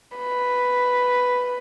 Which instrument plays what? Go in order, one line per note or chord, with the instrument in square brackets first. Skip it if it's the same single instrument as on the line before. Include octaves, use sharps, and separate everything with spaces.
[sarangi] B4